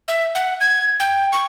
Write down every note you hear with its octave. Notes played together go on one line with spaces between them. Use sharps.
E5
F#5
G#6
G5
C#6